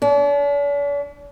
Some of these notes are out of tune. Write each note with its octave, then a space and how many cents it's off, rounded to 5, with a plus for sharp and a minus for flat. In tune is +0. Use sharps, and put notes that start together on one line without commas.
D4 -45